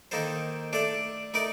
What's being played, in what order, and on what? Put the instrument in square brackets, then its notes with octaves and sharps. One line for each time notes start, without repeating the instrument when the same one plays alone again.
[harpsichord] D#3 A#3 D#4 A4 C5
A3 D4 A4 D5
A3 D#4 A#4 D5